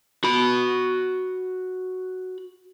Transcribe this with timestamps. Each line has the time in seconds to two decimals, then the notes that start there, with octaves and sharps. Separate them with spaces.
0.24 F#4 B5